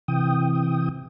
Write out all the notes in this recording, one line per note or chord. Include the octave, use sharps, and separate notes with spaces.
C3 E3 G5 D#6